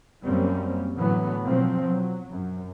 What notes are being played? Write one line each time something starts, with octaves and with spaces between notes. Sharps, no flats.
F#2 G3 A#3 C4 C#4
A2 D3 E3 F#3 B3
B2 F3 F#3 C4
F#3
F#2